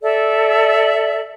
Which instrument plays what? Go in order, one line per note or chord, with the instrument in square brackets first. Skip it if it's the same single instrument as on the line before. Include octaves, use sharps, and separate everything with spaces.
[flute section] A4 D5 E5